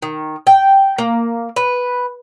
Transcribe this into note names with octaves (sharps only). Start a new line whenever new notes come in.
D#3
G5
A#3
B4